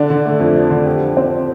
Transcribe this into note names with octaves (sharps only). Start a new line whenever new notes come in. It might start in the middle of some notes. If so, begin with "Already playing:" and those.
Already playing: D3 D4
D3
A3
F2
D4
D3
G4
F3
C4